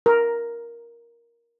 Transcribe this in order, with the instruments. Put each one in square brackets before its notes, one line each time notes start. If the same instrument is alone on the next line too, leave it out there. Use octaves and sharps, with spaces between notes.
[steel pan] A#4